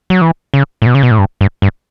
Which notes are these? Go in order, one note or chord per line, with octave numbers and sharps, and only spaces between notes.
F#3
E3
C#3
A2
B2
C#3
B2
A2
G2
G2
G2